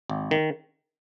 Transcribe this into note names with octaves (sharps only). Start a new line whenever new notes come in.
G#1
D#3